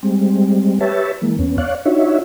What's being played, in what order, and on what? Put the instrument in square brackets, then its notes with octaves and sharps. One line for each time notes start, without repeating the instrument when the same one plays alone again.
[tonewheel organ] G3 G#3 C4
G4 B4 C#5 E5 A5
E3 G#3 A#3
E2 B3 C#4
C#5 D5 F5 F#6
D4 D#4 F4 F#4 C#5 E5